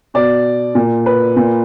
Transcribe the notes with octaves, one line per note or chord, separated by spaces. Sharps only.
B2 D5
A#2
B4
A#2